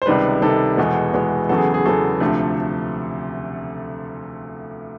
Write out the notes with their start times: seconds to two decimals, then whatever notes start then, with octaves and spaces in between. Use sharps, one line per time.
0.02 C5
0.06 C#2 C3 D#3 G3 B4
0.42 C#2 C3 D#3 G3 A4
0.77 E2 B2 G#3 B3
1.14 E2 B2 G#3 B3
1.49 E2 C#3 F#3 B3 A4
1.58 G#4
1.74 G#4
1.85 E2 C#3 F#3 B3 A4
2.20 D2 C3 F3 A3